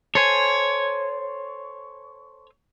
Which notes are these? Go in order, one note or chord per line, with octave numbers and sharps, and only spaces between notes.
A4 C5 C#5 G#5